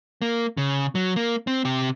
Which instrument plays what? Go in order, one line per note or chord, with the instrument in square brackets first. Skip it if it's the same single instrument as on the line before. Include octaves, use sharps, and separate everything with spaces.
[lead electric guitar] A#3
C#3
F#3
A#3
C4
C3 G4